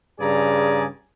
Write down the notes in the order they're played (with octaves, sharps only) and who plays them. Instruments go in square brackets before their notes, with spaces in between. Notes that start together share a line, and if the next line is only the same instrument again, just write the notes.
[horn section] G2 C#3 G#4 D5 G#5 A#5